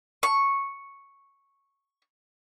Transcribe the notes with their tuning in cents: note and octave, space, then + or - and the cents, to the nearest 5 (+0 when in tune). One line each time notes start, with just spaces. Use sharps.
C#6 -5